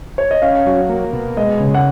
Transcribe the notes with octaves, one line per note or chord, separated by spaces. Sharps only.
C#5
D#5
C#4 F5
F#3
A#3
B2
G#3 D#5
C#3
F#5